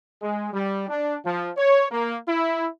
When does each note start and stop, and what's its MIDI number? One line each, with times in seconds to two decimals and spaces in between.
0.21 0.49 56
0.53 0.87 55
0.89 1.16 62
1.25 1.50 53
1.57 1.85 73
1.91 2.17 58
2.28 2.67 64